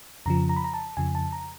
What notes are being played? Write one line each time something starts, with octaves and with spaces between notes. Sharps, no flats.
F2 C#3 F3 A#5
A#5
B5
A#5
A5
F2 C#3 F3 G#5
A5
A#5